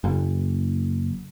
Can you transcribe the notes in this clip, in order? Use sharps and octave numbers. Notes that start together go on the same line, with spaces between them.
F#1